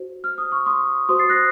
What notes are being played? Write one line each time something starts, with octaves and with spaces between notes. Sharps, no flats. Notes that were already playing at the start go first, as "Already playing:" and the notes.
Already playing: F#4 C5
F6
D#6
C#6 F6
C6 D#6
F#4 C5 C6 D#6
A6 C7
F#6 A#6